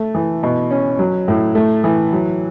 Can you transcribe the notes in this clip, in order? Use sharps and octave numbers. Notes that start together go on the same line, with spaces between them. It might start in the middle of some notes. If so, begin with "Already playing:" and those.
Already playing: A3
E3
B2
C#4
F#3
A2
A3
E3
F#3